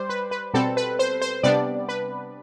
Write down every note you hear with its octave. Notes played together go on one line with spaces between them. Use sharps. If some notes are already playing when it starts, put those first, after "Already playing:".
Already playing: G3 C5 D5
B4
B4
B2 G3 C4 A4
B4
C5
C5
C3 G3 B3 D4 D5
B4